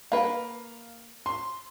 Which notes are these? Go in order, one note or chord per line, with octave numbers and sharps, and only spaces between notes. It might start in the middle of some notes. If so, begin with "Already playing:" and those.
A#3 B4 F5
C6